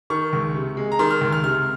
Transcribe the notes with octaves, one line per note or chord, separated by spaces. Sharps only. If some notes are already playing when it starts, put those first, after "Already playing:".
D#3 C#6
C#2
C3
G#3
A#5
D#3 C6
F6
C#2
F6
C3 F6